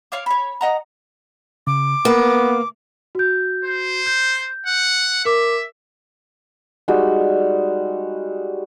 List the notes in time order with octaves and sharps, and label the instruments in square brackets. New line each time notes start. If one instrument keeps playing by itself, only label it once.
[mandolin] F4 C#5 F5 D6
C#5 B5
D#5 F#5 A#5
[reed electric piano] C#3 [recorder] D6
[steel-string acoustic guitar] A#3 [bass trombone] B3 [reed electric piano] B4
[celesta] F#4 G6
[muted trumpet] C5
[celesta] G6
[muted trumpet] F#5
[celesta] A#4 D6 [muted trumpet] E5
[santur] G3 G#3 D#4 F#4